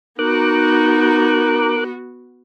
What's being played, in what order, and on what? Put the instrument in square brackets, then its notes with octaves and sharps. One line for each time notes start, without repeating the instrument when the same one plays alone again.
[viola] B3 F#4 [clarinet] D#4 [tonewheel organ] A#4 D6 F#6